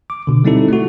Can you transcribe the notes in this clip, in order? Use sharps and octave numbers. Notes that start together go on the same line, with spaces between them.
D6
B2 D3
G3 C4 D#4 E4 A4
A3 F#4